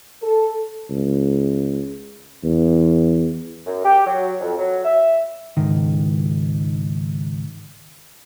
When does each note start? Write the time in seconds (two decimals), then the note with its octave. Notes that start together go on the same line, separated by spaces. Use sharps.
0.22 A4
0.90 C#2
2.44 E2
3.66 F#2
3.85 G4
4.06 F#3
4.41 F2
4.58 F#3
4.85 E5
5.57 C#2 G#2 D#3